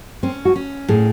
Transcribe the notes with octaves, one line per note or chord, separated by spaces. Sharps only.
C4 C#4
F#4
C#4
A2 G#4